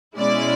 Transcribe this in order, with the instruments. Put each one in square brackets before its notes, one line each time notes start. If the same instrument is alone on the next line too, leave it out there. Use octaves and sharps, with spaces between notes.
[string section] B2 G#3 C#4 E4 D5